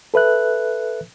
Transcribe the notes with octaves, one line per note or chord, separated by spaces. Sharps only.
A4 B4 E5 F#6